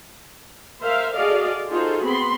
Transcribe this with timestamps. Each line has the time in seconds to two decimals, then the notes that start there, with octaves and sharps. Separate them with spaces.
0.82 A#4 C5 E5 F5
1.14 F#4 G#4 A4 D5 D#5 F5
1.69 D#4 F4 F#4 G#4 A4 C5
2.03 B3 C4 B5 C6